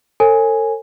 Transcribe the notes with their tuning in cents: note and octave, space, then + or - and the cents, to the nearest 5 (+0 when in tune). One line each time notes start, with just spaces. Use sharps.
A4 +40 C#5 -45 G#5 +0